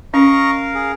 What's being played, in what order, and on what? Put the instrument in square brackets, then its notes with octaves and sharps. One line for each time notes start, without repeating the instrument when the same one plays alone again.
[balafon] C#4 [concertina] A#4 F5 [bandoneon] D#5 A#5 C#6
[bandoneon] G#4